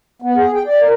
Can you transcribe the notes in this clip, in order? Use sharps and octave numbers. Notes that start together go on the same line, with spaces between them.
B3
G#4
G5
D5
A#4